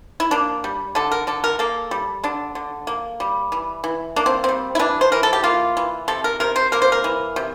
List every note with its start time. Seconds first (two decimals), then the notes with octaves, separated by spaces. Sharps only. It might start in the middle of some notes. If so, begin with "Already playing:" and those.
0.20 E4
0.31 A#3 D4
0.64 G3
0.95 D3 A4
1.12 A#4
1.27 D3 A4
1.44 A#4
1.59 A#3 A4
1.91 G3
2.24 D3 D4
2.55 D3
2.87 A#3
3.20 G3
3.52 E3
3.84 E3
4.16 A#3 D4
4.26 C4
4.44 G3 C4
4.75 E4
4.79 E3 D4
5.01 C5
5.12 E3 A#4
5.23 A4
5.33 G4
5.44 A#3 F4
5.77 E3
6.08 C3 A4
6.24 A#4
6.40 C3 A#4
6.56 C5
6.72 A#3 A#4
6.82 C5
6.92 A#4
7.04 E3
7.36 C3